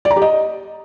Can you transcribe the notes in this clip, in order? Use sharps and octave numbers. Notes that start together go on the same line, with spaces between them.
D5
A#5
G4
D#5